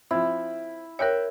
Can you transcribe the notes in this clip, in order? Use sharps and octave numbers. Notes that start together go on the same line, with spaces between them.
F3 C4 E4
A#4 C#5 E5 G5 F#6